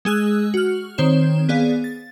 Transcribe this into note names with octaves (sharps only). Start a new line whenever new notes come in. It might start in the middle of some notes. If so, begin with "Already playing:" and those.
G#3 G#4 E6 F#6
F#4 F6
D#3 C4 C5 C#5 E7
B3 G#4 D5 F5
A6